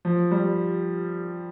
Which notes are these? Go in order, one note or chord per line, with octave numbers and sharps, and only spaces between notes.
F3
G3